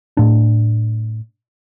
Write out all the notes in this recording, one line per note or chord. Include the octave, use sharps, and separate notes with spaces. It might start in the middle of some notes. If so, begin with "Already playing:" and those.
A2 D4